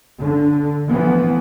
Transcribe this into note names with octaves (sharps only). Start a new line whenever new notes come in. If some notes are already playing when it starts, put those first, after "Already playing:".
D3
E3 F3 A3 B3